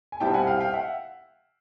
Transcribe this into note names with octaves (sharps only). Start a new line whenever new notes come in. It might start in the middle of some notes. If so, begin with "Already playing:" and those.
G#5
C2 B2 G3 C4 E4 G5 A5
F#5 G#5
F5 G5
F5 G5
E5 F#5